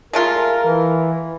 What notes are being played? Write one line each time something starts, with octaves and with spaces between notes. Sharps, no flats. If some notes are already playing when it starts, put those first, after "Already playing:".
G#3 A3 F4 A#4
E3